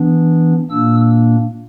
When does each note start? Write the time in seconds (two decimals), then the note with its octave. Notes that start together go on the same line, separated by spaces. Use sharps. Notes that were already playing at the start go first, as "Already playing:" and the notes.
Already playing: E3 B3 D4
0.70 A#2 A#3 D4 E6